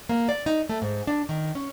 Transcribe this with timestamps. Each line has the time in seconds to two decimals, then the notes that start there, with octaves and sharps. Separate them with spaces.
0.09 A#3
0.29 D5
0.46 D#4
0.69 A3
0.82 G#2
1.07 D4
1.29 D#3
1.55 C#4